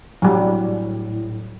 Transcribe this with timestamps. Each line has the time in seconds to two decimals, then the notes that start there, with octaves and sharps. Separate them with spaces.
0.22 A2 F#3 G3